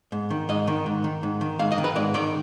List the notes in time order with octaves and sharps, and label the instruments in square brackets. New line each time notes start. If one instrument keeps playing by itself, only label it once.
[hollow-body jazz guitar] G#2
D#3
G#2 D#5
D#3
G#2
D#3
G#2
D#3
G#2 F5
D#5
D#3
B4
G#2 D5
D#3 D5